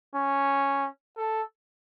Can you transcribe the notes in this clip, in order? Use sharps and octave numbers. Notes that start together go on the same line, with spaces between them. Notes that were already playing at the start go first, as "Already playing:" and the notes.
C#4
A4